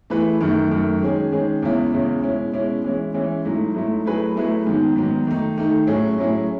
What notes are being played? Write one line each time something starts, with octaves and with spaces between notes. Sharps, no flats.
E3 A3 E4 G#4 B4
F#2 D#3 A3
F#2 D#3 A3
D#3 G#3 C#4 G#4
D#3 G#3 C#4 G#4
E2 C#3 G#3 C#4 E4
E2 C#3 G#3 C#4 E4
B2 G#3 C#4 E4
B2 G#3 C#4 E4
E3 G#3 C#4 E4
E3 G#3 C#4 E4
G#2 F#3 A3 E4
G#2 F#3 A3 E4
F#3 A3 E4 G#4 B4
F#3 A3 E4 G#4 B4
G#2 D#3 F#3 B3
G#2 D#3 F#3 B3
D#3 A3 D#4
D#3 A3 D#4
A2 F#3 C#4 E4 G#4
A2 F#3 C#4 E4 G#4